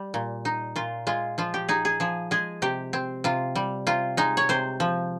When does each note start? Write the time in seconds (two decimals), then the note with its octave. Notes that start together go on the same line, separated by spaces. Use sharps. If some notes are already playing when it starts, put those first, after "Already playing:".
Already playing: G3
0.14 A#2
0.45 D#4
0.76 A#2 F4
1.07 G#3 F4
1.38 F3 F4
1.54 G4
1.69 D#4 G#4
1.85 G#4
2.00 F3 G#4
2.31 G#3 G#4
2.62 C3 G4
2.93 C4
3.24 C3 F4
3.55 G3
3.87 C3 F4
4.17 G#3 D#4
4.37 C#5
4.49 C3 C5
4.80 F3